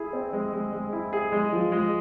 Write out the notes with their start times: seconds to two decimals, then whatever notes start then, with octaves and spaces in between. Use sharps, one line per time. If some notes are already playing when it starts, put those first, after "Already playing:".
Already playing: E4 G#4
0.13 C4
0.33 G#3
0.53 G#3
0.72 G#3
0.93 E4
1.13 G#4
1.32 G#3
1.53 F3
1.72 G#3